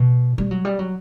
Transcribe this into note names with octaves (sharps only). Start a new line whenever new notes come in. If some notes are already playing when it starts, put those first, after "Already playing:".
Already playing: B2
G3
F#3
G3
F#3